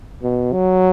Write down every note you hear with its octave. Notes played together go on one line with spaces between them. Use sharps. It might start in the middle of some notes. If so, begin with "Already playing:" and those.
B2
F#3